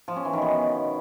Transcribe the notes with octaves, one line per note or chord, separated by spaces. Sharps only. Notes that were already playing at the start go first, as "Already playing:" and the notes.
F3
C#4
E3
D#3
B2